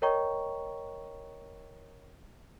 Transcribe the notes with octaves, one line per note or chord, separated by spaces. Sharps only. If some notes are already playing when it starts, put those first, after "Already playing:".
A#4 C#5 D#5 G5 A#5 C#6